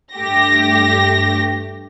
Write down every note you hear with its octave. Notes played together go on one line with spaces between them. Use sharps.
G2 A3 G4 A#6